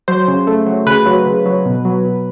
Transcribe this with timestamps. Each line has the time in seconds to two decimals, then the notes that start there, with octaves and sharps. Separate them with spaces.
0.08 F#3 C5
0.28 C#3
0.47 A3
0.66 F#3
0.87 C#3 B4
1.06 F#3
1.26 C#3
1.46 F#3
1.66 B2
1.85 F#3
2.05 B2